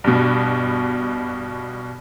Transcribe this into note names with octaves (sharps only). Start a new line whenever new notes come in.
G2 B2